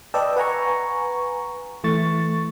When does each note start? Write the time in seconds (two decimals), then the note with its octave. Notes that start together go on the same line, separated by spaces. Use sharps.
0.14 B4 D5 D#5 G5 A5 E6
0.36 B4 F#5 G#5 A#5 C#6
1.84 E3 A3 C#6 A6